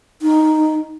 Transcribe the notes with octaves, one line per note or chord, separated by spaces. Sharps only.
D#4